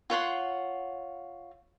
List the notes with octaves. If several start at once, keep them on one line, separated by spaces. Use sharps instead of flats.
F4 C#5 F#5 C6